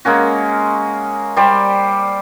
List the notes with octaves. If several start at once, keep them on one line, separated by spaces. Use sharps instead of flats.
G#3 A#3 C#4 F#4
G3 G4 C5 D5